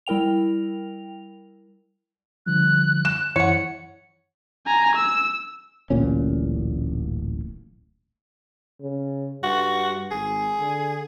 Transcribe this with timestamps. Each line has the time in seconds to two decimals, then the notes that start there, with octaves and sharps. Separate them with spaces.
0.07 G3 E4 A#4 G5 F7
2.46 D3 F3 G3 F#6
3.05 E7
3.36 F#2 E3 E4 C#5 F#5 C#7
4.67 G#5 A#5
4.95 E6
5.90 D1 A1 A#2 C#4
8.81 C#3
9.43 G2 F#4
10.11 G#1 G#4
10.60 D3